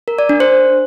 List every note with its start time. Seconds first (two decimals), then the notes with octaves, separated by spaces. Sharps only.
0.08 A#4
0.19 D5
0.29 D4
0.40 C5